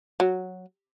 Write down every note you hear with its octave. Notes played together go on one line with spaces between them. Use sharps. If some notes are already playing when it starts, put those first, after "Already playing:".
F#3